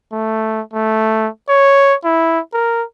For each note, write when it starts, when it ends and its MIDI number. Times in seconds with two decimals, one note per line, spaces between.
0.12 0.61 57
0.73 1.28 57
1.49 1.94 73
2.04 2.40 64
2.53 2.83 70